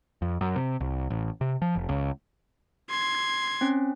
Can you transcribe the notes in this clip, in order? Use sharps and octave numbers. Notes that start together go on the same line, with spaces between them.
F2
F#2
C3
C2
A1
C3
F3
F1
C#2
C6 G#6
C4 C#4